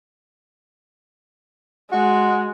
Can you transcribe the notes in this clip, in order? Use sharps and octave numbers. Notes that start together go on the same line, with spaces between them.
G#3 F#4